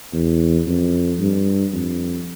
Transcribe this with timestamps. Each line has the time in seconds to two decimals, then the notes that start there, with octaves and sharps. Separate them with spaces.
0.13 E2
0.66 F2
1.19 G2
1.73 F2